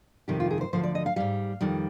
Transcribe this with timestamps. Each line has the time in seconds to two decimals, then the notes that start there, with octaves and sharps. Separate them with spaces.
0.28 F2 C3 D#3 G3 G4
0.40 F4
0.50 G#4
0.61 C5
0.73 D2 D3 F3 C5
0.83 D5
0.95 D#5
1.06 F5
1.16 G#2 G3 F5
1.61 F2 D#3 G3